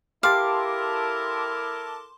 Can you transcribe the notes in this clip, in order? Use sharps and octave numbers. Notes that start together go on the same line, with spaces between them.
E4 G4 A4 A#4 F5 A5 C6 D6